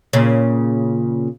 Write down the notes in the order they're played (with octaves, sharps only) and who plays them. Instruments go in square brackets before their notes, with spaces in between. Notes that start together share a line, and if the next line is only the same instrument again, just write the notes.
[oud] A#2 C#3